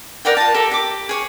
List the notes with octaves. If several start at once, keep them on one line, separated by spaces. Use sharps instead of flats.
A#4 D5 F#5 G5
F4 A5
G4 A4 A#4
G4 D6
G#4 C#5